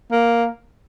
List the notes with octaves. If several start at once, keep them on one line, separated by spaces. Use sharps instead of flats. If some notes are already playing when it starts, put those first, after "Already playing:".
A#3